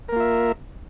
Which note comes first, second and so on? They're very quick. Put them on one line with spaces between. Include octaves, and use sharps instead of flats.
A#4 A#3 F4 E5